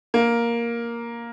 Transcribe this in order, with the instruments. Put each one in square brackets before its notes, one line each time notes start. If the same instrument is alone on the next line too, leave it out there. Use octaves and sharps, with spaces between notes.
[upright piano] A#3